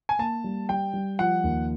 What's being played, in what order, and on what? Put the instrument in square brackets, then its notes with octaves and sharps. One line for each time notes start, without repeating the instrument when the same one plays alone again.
[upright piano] G#5
[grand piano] A#3 [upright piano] A5
[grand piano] G3
[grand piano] G3 [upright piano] G5
[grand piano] G3
[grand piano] F3 [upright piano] F#5
[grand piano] D#2